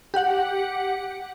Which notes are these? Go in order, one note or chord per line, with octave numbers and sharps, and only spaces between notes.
G4 F#5